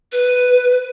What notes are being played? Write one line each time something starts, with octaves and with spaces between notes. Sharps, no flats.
B4